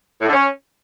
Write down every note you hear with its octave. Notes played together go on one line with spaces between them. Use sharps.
A2
D3
C#4